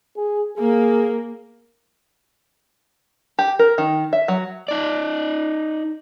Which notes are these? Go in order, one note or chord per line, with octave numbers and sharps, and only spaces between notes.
G#4
A#3 G#4
G4
A#4
D#3
E5
F#3
D#4 D5